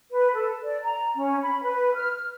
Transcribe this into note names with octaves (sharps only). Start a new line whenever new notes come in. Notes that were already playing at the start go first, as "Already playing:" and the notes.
B4
A4
D5
A#5
C#4
B5
B4
F6